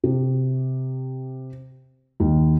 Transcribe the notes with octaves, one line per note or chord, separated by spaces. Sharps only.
C3
D#2